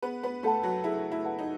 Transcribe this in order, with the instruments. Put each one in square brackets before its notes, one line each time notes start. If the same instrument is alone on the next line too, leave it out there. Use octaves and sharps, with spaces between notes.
[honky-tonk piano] B3 B4 [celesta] G#4
[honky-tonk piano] B3 B4
[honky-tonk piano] A3 A4 [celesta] B4 F#5 A5
[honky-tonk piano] F#3 F#4
[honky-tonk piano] E4 [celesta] G#4
[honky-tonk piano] E4
[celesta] B4 F#5 A5
[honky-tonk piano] D#4